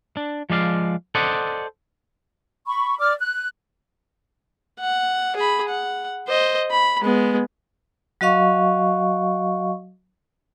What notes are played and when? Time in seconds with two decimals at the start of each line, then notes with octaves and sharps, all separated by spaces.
0.17 D4
0.50 F3 G#3 D5 F5
1.15 A4 C5 D5 D#5 F#5
2.67 B5 C#6
2.99 D5 D6 F6
3.20 F#6
4.80 F#5
5.36 G#4 B5
5.68 F#5
6.28 C5 D#5
6.71 B5
7.01 G#3 B3
8.21 F#3 F#4 D#5 F5 C#6